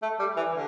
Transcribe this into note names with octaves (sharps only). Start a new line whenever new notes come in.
A3
G3
E3
D3